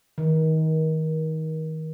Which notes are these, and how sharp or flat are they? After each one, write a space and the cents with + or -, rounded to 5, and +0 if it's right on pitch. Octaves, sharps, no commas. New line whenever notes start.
D#3 +30